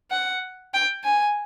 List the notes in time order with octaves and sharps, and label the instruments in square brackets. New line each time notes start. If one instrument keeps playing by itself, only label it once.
[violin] F#5
G5
G#5